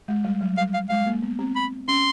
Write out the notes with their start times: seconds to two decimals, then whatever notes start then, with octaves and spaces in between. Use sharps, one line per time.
0.08 G#3
0.25 G3
0.41 F#3
0.57 G3 F5
0.74 F5
0.89 G#3 F5
1.06 A#3
1.22 B3
1.39 C4
1.56 B5
1.88 C#4 C6